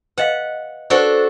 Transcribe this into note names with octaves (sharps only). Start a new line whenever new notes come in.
B4 D#5 F5 F#5
D4 F#4 A4 B4 C5